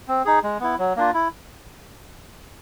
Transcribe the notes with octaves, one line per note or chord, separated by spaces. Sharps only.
C4
D#4 G#4
G#3
B3 E4
F#3
A#3 D4 F4
E4